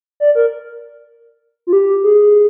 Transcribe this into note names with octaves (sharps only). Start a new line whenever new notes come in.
D5
A#4
F4
G4
G#4